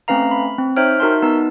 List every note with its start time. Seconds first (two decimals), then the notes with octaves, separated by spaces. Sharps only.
0.08 A3 C4 C#4 B4 F5 A#5
0.31 B5
0.58 C4
0.77 D#4 C5 C#5 E5 G5 F6
1.00 D#4 F#4 A#4 E5 A5 C6
1.22 B3 D#4 B4 A5 E6